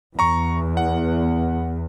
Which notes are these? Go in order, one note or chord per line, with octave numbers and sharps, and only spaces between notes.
E2 A#5 C#6
F#5